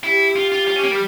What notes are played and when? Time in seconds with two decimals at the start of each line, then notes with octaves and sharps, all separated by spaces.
0.04 E4 G4
0.36 F4
0.52 F4
0.68 F4
0.76 C#4
0.84 A#3
0.92 G3